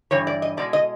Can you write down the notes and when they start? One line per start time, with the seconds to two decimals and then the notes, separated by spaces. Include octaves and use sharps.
0.11 G2 E3 C#5
0.27 D5
0.42 D#5
0.57 B2 G#3 D5
0.73 D#5